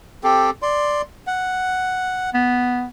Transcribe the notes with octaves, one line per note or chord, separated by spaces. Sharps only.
C4 G4 A4
D5 C6
F#5
B3